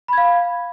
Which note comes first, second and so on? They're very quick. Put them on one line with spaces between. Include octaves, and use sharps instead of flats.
B5 G#6 F5